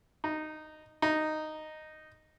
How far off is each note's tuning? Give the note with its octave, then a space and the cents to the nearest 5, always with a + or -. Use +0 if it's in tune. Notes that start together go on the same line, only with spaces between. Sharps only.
D#4 -10
D#4 -5